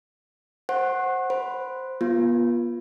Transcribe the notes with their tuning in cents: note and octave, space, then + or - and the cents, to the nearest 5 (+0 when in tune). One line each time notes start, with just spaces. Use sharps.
C5 +10 F#5 +0 C#6 -40
C5 +0 B5 +0
B3 -40 F4 +0